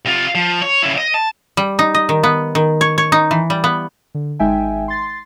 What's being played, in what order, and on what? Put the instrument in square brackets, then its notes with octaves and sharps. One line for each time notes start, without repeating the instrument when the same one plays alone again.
[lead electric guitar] C3 F4
F3
C#5
C#3 E4
D#5
A5
[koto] G3
D#4
D#5
D#3
B3
D#3
C#5
C#5
D#4
E3
G3
B3
[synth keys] D3
G#1 G#3 D#4 E5 G5 G#5
C6 A6 C7